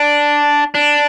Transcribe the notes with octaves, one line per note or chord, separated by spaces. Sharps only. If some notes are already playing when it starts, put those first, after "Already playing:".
Already playing: D4
D4